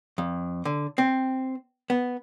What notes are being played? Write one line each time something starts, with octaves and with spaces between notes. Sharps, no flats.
F2
D3
C4
B3